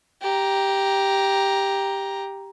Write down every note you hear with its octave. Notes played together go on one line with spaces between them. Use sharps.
G4 A#5